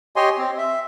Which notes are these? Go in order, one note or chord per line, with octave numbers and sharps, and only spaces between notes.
G4 C#5 D#5 G#5 C6
C4
E5